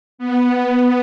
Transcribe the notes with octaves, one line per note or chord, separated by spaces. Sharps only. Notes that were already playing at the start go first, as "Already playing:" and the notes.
B3